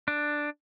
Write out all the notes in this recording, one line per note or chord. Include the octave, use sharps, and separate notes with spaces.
D4